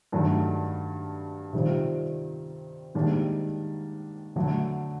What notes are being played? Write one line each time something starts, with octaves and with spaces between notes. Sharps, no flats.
G2 D#3 F#3 A3
C3 D#3 G3 C4 F4
G#2 D#3 G3 A#3 D4
D3 F#3 A3